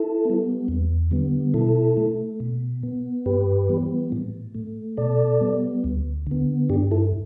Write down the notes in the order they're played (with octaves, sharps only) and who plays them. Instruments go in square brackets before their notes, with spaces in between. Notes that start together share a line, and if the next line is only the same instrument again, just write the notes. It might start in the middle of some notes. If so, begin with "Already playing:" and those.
Already playing: [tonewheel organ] E4 A4
G3 B3
E2
D3 G3 B3
B2 E4 A4
A3
B2
B3
G2 G4 B4
E3 G3 B3
A2
A3
B2 A4 D5
G3 B3
D2
D3 B3
G2 D4 G4
E4 A4